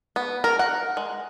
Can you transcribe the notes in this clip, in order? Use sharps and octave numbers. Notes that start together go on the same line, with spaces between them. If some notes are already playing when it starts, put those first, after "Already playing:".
B3
A#4
F#5
G#3